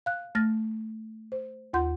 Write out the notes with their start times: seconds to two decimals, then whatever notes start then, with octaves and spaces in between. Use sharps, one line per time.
0.06 F5 F#6
0.35 A3 F6 A6 A#6
1.32 C5
1.73 D#2 F4 F#5 C6 G6